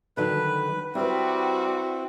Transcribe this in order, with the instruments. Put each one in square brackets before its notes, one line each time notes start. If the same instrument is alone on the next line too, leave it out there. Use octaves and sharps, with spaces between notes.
[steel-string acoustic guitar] D3 D#3 F#3 [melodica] B4
[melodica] G3 [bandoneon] C4 [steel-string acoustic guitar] E4 B4 [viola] F#4